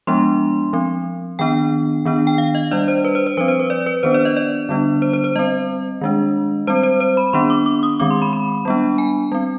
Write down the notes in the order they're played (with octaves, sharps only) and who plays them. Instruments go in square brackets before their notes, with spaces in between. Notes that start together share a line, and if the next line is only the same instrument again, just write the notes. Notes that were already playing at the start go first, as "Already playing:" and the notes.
[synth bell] F3 G#3 B3 D4 C6
F3 C4
D#3 B3 D4 G5
D#3 B3 D4
G5
F5
D#5
G3 D4 D5
C5
B4
C5
C5
F3 C4 B4
C5
B4
D5
B4
D#3 B3 D4 C5
D5
D#5
D5
D3 G3 B3 D4
C5
C5
C5
G3 C4 D#5
D#3 G#3 D4
G3 C4 C5
C5
C5
B5
D#3 B3 D4 C6
D6
D6
D#6
D#3 G#3 C4 D6
C6
B5
B5
G3 B3 D4
G#5
G3 C4